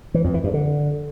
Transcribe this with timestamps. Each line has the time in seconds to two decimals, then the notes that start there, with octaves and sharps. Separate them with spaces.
0.14 E3
0.24 F2
0.34 E3
0.44 G2
0.54 D3